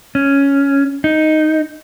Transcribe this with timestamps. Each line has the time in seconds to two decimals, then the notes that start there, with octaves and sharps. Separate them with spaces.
0.15 C#4
1.04 D#4